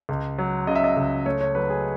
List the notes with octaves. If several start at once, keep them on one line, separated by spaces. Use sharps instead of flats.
C#2
F#3
C#3 D#5
E5
D#5
C#2
A3 C#5
C#5
F#3 B4
G#4